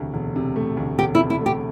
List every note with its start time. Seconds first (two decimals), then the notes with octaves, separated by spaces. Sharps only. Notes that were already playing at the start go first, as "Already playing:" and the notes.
Already playing: E1 D2 C3 A3
0.14 E1
0.36 C3
0.56 A3
0.77 D2
0.99 E1 G4
1.15 E4
1.19 C3
1.30 E4
1.40 A3
1.46 G4